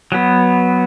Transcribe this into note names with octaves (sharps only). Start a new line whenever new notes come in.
F#3 B3